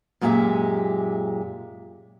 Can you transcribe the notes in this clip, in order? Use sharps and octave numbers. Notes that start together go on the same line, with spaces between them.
F#2 A#2 G#3 G4 E5